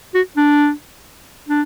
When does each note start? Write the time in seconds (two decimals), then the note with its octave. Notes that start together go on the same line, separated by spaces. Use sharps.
0.14 F#4
0.37 D4
1.49 D4